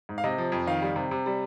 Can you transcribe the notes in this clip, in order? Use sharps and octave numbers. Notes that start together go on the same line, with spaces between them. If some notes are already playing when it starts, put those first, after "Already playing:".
G#2
F5
C3 D#5
F3
F2
D#3 F5
G3
C3
C3
G3